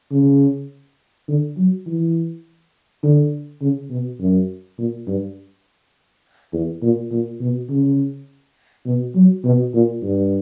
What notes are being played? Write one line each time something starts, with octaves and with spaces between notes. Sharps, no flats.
C#3
D3
F#3
E3
D3
C#3
B2
F#2
A#2
G2
E2
A#2
A#2
B2
C#3
B2
F#3
B2
A#2
G2